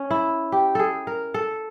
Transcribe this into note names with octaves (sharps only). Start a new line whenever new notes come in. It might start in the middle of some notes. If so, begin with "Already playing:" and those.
Already playing: C#4
E4
G4
G#4 A4
A#4
A4